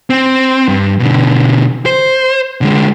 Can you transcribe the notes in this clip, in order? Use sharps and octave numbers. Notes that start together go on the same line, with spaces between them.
C4
G2
B2 D3
C5
D3 G#3